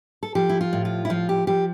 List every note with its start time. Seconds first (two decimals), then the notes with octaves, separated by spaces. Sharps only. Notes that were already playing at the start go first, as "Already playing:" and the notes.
0.23 A4
0.35 F3 G4
0.49 E4
0.61 F4
0.73 A2
0.85 F4
1.05 E4
1.10 F3 F4
1.29 G4
1.47 F3 G4